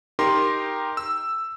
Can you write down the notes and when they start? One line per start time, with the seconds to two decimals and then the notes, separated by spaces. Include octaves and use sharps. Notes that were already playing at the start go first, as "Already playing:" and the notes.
0.19 D#4 G4 A#4 C6
0.97 E6